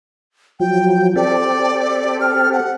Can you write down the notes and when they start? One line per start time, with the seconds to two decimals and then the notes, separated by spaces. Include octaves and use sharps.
0.60 F3 F#3 G5
1.16 C4 G4 A4 D5
2.21 F6
2.53 F#5